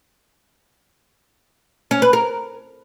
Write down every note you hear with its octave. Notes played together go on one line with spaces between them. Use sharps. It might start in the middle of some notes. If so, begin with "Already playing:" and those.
C#4
B4
A#4